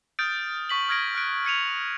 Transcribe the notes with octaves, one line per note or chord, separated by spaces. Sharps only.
D#6 F6 G6 A6 D7
C#6 B6 F#7
D#6 F6 G#6 A#6 D7
F6 F#6 D7
G#6 C#7 D#7 F7